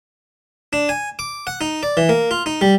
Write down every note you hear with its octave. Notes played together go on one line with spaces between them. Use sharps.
D4
G#5
D6
F#5
D#4
D5
E3
A#3
F4
D#4
G3